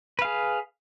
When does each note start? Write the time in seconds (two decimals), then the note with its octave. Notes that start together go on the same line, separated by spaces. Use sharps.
0.19 B4
0.22 F5
0.25 G#4